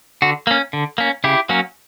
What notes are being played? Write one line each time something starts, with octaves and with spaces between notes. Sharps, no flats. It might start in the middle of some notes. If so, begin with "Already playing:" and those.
D3 F#4
A#3 C#4
D3
A#3 C#4
C#3 E4 G4
F#3 A#3 C#4